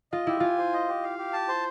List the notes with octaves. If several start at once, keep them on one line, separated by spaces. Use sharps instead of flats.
F4 D#5
E4 G4
F4 G#5
C5
D#5
G4
F5
G4
A5
C5